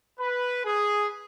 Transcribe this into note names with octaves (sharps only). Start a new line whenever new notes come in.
B4
G#4